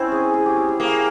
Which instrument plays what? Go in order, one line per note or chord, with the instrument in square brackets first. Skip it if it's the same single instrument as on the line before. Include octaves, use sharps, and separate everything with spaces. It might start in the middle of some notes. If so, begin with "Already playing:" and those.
Already playing: [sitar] C4 [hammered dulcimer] C#4 E4
[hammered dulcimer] G#4
G#4
G4
G4
G#4
[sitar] A#3